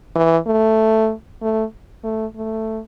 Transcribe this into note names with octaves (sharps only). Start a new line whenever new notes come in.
E3
A3
A3
A3
A3